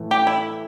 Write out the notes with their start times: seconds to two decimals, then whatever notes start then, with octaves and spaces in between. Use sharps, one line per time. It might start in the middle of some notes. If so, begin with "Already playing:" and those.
Already playing: A2 E3 A3
0.11 G4
0.27 E4